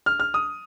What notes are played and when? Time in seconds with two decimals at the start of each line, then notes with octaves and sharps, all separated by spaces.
0.06 F6
0.20 F6
0.34 D#6